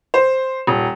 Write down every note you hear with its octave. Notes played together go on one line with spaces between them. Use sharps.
C5
D#1